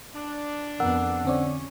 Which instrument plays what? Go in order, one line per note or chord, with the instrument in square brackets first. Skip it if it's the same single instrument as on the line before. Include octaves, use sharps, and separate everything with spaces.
[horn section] D4
[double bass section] F2 B3 [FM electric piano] A#4 [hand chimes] F#5 E6
[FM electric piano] D3 C4 D5 [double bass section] C#4